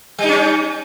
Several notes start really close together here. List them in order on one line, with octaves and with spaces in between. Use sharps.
G3 D#4 C#4